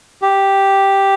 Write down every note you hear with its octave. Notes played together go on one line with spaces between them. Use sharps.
G4